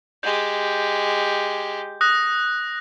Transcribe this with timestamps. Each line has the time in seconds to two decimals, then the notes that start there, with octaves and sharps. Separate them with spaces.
0.23 G#3 G4 G6
2.01 D#6 F#6 A#6